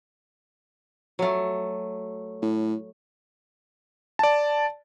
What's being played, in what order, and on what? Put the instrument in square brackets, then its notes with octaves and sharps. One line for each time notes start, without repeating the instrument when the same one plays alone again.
[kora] F#3 A3
[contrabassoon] A2
[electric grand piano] D5 A5